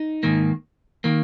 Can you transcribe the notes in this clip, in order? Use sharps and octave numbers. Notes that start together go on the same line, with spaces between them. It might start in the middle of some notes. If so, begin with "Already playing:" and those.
Already playing: D#4
G#2 D#3 A#3
D#3 A#3